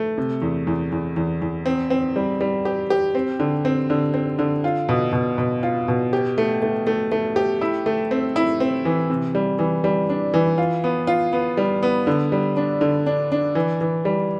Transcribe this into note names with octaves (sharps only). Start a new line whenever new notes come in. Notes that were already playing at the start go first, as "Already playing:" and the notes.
Already playing: A3
C3
E2
E2
E2
E2
E2
C4
C4
G3
G3
G4
G4
C4
D3
C4
D3
C4
D3
F4
B2
B2
B2
F4
B2
G4
A3
A3
A3
A3
G4
E4
A3
C4
E4
C4
E3
C3
G3
E3
G3
D4
E3
F4
B3
F4
B3
G3
B3
D3
G3
D4
D3
D4
D4
E3
E3
G3